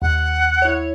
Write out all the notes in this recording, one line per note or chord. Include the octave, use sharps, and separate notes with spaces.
D#2 F#5
E4 C#5